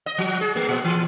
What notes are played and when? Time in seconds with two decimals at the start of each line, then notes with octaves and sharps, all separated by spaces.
0.06 D#5
0.18 F3
0.41 G#4
0.56 A3
0.68 A#2
0.85 E3